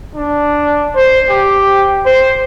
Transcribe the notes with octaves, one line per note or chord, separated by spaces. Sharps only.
D4
C5
G4
C5